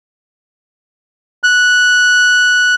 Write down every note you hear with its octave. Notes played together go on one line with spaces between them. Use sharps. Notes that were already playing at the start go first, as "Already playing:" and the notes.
F#6